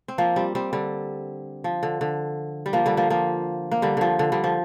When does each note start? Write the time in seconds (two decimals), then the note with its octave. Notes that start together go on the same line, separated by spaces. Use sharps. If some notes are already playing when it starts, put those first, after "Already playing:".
0.08 C4
0.18 F3 A#3
0.36 G3 C4
0.55 G3 C4
0.73 D3 G3
1.64 F3
1.83 D3
2.01 D3
2.66 G3
2.73 F3 A#3
2.86 D3 G3
2.97 F3 A#3
3.10 F3 A#3
3.71 A#3
3.82 D3 G3
3.97 D3 F3
4.19 D3
4.32 D3 G3
4.44 F3